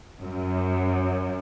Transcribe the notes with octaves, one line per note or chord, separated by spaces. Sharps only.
F#2